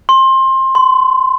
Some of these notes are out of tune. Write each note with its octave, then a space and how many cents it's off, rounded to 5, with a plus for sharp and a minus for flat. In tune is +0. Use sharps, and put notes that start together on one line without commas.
C6 +20
C6 -30